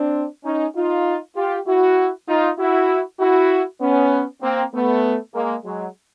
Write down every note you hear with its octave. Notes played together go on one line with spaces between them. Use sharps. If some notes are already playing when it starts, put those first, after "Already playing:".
Already playing: C4 D4
C#4 D#4
D#4 F4
F4 G4
E4 F#4
D#4 F4
E4 F#4
E4 F#4
B3 C#4
A#3 C4
A3 B3
G#3 A#3
F#3 G#3